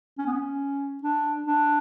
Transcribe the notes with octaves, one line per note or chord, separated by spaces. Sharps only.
C#4
B3
C#4
D4
D4